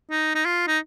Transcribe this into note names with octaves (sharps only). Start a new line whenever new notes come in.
D#4
D#4
F4
D#4